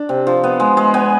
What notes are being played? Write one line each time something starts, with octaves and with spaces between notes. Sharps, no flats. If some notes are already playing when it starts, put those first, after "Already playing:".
Already playing: D4
C3
F3
B3
G#3
G#3
B3 G#5